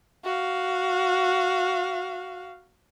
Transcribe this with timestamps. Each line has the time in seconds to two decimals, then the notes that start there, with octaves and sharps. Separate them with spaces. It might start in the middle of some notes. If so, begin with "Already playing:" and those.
0.24 F#4 F5